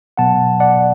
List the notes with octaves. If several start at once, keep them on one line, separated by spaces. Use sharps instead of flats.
B2 F#3 B3 F#5 A5
D5 F#5